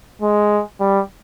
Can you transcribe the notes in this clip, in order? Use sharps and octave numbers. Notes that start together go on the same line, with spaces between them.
G#3
G3